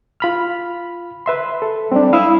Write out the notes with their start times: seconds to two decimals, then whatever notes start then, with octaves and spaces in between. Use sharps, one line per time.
0.20 F4 B5 F6
1.26 B4 E5 C6
1.62 A4
1.92 G3 C4 D4
2.13 E4 F5 D#6 E6